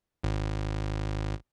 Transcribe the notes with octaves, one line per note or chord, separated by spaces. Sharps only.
G#1